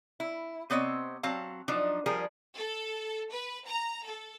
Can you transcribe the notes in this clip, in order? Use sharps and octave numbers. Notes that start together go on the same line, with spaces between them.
E4
C3 B3 C4 C#5 D#5
F#3 C4 F5 A5
F3 F#3 D4 D#4
F3 G3 G#4 A#4
A4
B4
A#5
A4